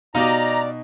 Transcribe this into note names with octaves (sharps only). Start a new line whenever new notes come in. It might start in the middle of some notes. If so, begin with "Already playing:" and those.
B2 D#4 G4 D5 F5 A#5